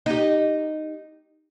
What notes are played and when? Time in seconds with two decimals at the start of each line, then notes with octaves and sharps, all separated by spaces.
0.06 D#4 G4